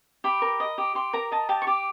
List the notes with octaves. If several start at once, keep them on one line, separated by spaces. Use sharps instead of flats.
G4 B5
A#4
D#5
G4
G4 C6
A#4 A#5
D#5 A5
G4 A5
C#6
G4 D6